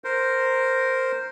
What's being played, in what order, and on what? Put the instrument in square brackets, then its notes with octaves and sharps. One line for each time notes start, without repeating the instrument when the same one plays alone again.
[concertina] A#4 C5